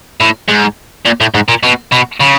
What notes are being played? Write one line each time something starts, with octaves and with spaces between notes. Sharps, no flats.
A2
G#2
A#2
A2
G#2
A#2
B2
B2
C#3